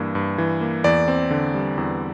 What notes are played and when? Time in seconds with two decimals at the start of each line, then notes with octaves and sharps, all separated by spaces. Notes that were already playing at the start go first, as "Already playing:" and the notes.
Already playing: G2 E3 A#3
0.15 G2
0.38 E3
0.61 A#3
0.84 E2 D5
1.08 C4
1.31 D3
1.54 G3
1.78 E2